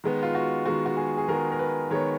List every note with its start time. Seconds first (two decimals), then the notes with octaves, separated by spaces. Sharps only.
0.04 D#3 G#3 B3
0.23 F4
0.35 F#4
0.66 D#3 G#3 B3 F#4
0.86 F#4
0.97 G#4
1.17 G#4
1.28 D#3 G#3 B3 A#4
1.52 A#4
1.59 B4
1.91 D#3 G#3 B3 C#5